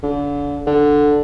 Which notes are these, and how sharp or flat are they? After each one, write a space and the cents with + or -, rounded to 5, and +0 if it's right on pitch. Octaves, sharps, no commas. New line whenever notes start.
D3 -35
D3 +0